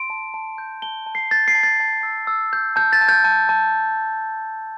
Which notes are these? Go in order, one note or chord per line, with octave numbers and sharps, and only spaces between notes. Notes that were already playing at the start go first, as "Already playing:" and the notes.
Already playing: C6 D7
A5
A5
G6
A5 G7
A5
C7
G6 A6
C7
A5
A6
A5
E6
E6
G6
A5 G6
A6
A5
G6
A5
A5